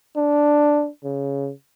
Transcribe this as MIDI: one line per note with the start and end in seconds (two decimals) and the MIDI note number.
0.16 0.89 62
1.04 1.51 49